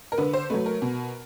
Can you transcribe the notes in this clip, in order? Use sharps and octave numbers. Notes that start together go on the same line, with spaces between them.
A#4
D3 B4
C5
F#3 A3 B4
A#4
B2